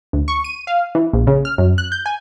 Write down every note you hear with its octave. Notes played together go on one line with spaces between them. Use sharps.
D2
C#6
D#7
F5
E3
A#1
C#3
F6
F#2
F#6
G6
G#5